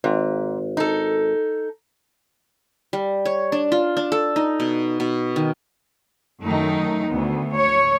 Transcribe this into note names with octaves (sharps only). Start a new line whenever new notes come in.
G#1 G#2
D#4 A4
G3
C#5
D4
F4
D4
A4
D#4
B2
B2
D#3
F#2 D#3 A3 D#4
D2 B3
C#5